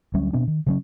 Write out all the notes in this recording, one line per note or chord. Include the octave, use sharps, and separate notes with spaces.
D2 F#3 G3 C#4
B2 B3 C4 D4
D#3
C#3 F#3 C#4